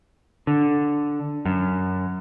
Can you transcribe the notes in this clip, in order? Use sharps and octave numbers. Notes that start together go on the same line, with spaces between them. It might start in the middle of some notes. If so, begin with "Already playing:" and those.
D3
F#2